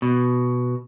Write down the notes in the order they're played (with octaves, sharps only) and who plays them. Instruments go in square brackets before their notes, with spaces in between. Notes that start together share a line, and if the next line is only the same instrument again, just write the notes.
[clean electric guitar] B2